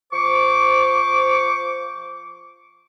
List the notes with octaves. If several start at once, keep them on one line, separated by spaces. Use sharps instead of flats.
F3 C5 C#6 D6